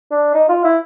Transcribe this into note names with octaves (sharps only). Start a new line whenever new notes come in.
D4
D#4
F4
E4